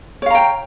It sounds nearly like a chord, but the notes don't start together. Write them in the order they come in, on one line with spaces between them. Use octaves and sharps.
C#5 F5 A#5 G5